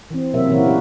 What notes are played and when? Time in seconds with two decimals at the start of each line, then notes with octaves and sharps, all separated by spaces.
0.11 E3 C4
0.34 C3 F#3 A#3 E5
0.47 A#2 C#3 E3 A#3 E4 F#4
0.64 B3 D4 F#4 G4 B4